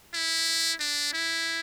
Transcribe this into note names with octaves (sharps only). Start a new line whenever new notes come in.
E4
D4
E4